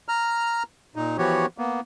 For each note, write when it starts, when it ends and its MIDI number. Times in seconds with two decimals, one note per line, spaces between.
0.09 0.63 82
0.09 0.63 89
0.96 1.17 46
0.96 1.17 63
1.18 1.46 52
1.18 1.46 53
1.18 1.46 59
1.18 1.46 66
1.18 1.46 67
1.18 1.46 73
1.58 1.80 58
1.58 1.80 59